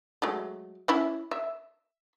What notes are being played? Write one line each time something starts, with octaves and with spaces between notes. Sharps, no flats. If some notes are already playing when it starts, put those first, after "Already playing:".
F#3 G#3 A3
C#4 E4 E5
E5